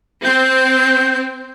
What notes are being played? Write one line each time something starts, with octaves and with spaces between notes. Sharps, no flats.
C4 G6